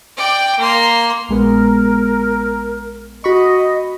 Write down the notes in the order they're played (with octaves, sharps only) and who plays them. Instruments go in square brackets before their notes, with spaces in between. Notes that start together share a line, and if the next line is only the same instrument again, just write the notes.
[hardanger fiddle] D5 G5
A#3 C6
[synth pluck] A#1 G#3 B3 [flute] A#4
[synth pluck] F#4 B5 C#6 [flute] D#5